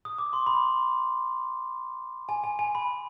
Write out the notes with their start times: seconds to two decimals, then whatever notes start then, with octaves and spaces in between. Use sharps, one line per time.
0.05 D#6
0.18 D6
0.33 C6
0.47 B5
2.29 G#5
2.44 G#5
2.59 G#5
2.75 B5